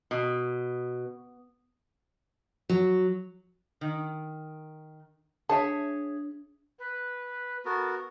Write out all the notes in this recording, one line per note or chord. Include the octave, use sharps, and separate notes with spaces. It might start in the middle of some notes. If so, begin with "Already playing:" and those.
B2
F#3
D#3
D4 G#4 C#5 E5 A5
B4
B3 F#4 A4 A#4